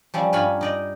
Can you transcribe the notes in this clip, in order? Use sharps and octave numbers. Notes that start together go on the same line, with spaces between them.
F3 G3 C#4 E5
G2 F4 C#5 G#5 B5
D#4 D5 D#5